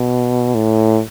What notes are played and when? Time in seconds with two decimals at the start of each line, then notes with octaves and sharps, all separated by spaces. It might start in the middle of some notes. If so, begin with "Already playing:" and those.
Already playing: B2
0.55 A2